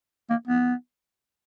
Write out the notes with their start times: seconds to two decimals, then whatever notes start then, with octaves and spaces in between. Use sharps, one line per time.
0.30 A#3
0.48 B3